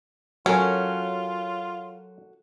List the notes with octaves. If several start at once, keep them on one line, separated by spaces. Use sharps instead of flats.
F#3 C#4 F4 F#4 A4 A#4 G#5